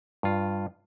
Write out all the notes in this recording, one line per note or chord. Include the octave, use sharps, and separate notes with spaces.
G2 F4